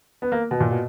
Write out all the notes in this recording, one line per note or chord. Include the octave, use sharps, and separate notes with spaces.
B3
A#3
B2
A#2
B2